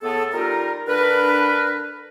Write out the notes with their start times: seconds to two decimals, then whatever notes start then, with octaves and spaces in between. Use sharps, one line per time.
0.02 A2 B3 G#4 A4
0.33 G3 D#4 F4 A#4
0.87 D3 D4 A#4 B4